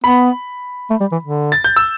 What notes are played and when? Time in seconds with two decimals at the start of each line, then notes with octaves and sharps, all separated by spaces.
0.04 B3 B5
0.90 A3
1.01 G3
1.12 E3
1.23 D3
1.52 A6
1.64 G6
1.76 E6